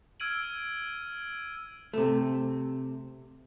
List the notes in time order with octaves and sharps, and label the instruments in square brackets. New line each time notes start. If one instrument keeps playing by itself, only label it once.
[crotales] E6 F6 G#6 D7 D#7 F#7
[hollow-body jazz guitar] C3 A3